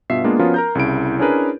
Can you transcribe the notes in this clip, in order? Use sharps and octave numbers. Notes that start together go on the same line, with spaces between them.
G2 B2 F4 E5 C7
G#3 A#3 B3 D4 F4
F3 B3 C#4 F4 F#4 A#4
A#4 A#5 G6
C2 C#3 E4 D7
C#4 D4 E4 G#4 A#4 B4